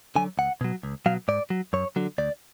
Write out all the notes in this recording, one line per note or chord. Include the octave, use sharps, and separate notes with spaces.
D3 F#3 G#5
C#2 F#5
B2 F#3
C#2
B2 F#3 F5
G#2 D5
F#3
F#2 C#5
D3 F#3
D2 D5